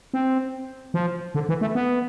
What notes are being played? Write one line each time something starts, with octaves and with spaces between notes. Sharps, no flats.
C4
F3
D3
E3
A3
B3